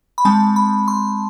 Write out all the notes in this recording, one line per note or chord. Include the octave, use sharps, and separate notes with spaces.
B5
G#3 C4 A5
B5
C6